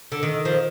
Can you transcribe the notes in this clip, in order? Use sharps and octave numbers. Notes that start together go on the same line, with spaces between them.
D3
D#3
F3